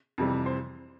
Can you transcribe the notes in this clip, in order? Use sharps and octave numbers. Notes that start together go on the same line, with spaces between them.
F2 C3 E3 G3
C5